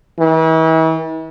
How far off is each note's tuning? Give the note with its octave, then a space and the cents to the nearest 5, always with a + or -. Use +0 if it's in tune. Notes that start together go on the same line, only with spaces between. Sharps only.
E3 -40